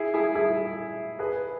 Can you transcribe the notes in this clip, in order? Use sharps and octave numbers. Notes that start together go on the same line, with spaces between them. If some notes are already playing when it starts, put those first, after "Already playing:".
Already playing: E4 G#4
E4 G#4
E4 G#4
G#4 B4